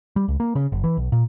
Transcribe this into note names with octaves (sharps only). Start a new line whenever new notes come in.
G3
C#2
A#3
C#3
F#1
E3
B1
A#2